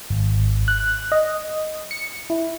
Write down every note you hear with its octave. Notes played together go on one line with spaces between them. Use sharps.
G#1
F#6
D#5
C#7
E4